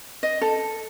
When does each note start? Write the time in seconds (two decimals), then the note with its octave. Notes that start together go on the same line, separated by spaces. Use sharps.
0.23 D#5
0.41 A4